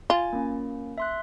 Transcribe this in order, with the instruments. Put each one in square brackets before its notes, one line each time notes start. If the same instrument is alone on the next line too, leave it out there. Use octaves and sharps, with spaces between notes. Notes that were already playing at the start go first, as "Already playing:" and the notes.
[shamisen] F4 [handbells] G#5 A6
[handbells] A#3 C#4
E5 C6 F#6